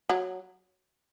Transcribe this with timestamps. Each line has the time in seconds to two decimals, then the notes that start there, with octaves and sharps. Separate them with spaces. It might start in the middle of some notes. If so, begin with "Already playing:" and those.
0.09 F#3